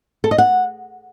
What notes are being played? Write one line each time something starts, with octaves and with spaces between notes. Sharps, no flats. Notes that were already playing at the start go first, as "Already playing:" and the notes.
A4
D#5
F#5